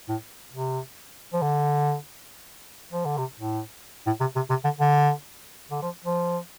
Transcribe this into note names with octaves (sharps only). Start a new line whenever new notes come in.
A2
C3
F3
D3
F3
D3
C3
A2
A2
C3
C3
C3
D3
D3
D3
F3
F3